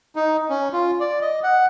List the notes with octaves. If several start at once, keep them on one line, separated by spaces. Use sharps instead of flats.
D#4
C#4
F4
D5
D#5
F#5